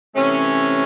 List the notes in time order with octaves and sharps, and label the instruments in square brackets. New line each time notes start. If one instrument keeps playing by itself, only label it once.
[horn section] C3 E3 A3 C#4